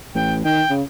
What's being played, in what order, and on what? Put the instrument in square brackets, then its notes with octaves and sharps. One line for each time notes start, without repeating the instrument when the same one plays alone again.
[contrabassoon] A1 [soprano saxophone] G5
[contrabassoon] D#3 [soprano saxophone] G5
[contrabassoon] C#3